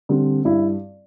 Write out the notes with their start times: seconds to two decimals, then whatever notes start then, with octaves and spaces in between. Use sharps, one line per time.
0.09 D3 G3 C4
0.45 G2 E4